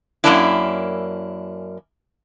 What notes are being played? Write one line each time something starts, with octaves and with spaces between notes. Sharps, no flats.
F#2 A#2 A#3 C#4 D4 E4